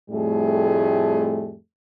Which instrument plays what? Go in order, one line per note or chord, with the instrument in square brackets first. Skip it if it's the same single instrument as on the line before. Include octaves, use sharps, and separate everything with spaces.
[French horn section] F2 A2 G3 A3 G#4